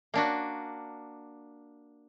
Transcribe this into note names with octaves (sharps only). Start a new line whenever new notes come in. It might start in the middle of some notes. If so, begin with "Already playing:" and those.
A#3 D4 F#4